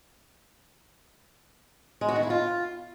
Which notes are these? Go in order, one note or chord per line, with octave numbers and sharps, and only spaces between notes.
G#3
F#4
D#3
E4
F4